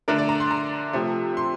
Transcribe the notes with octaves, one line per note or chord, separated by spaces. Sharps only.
D3 A3 D4 A#4
D5
A#5
C6
A#5
C3 F3 A3
C6